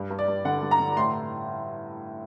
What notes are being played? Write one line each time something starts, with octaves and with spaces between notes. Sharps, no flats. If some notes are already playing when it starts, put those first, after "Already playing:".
Already playing: G2
G2
D5
G2
D3 F#5
G2
A#5
D3
A2 C6